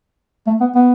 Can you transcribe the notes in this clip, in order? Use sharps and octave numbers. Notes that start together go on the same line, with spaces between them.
A3
B3
B3